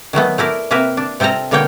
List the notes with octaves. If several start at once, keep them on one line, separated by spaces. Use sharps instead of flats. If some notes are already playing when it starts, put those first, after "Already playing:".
D#3 F#3 A3 B3
A3 E4 A#4 D5
C3 A#3 A#4 B4 E5
D4
C3 C4 F4 A4 A#5
B2 D3 A#3 C#5 G5